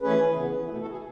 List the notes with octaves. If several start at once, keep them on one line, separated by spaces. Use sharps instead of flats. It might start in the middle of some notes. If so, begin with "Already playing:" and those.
E3 A3 C#4 G#4 B4
C#3 E3 B3
B2 A3 E4 G#4
F#4 A4
G#4